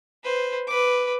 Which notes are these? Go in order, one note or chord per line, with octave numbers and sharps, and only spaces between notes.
B4 C5
B4 D6